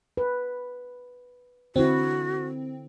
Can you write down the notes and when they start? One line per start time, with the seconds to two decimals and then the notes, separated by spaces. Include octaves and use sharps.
0.17 B4
1.76 D3 C4 E4 F#4